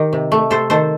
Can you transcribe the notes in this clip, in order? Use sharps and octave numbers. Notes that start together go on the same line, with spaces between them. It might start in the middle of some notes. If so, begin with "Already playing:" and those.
Already playing: D#3 G4 A#4
C3
A3
C3 A4 C5
D#3 A4 C5